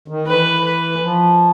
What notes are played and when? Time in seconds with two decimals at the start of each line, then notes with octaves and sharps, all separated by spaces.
0.08 D#3
0.27 E3 B4
0.64 B4
1.02 F3